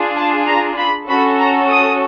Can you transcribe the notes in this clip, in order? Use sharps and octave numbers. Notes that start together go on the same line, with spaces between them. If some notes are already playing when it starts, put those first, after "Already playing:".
Already playing: D4 F4 G#4
A5
A#5
B5
C#4 F#4 A4 B5
A#5
D#6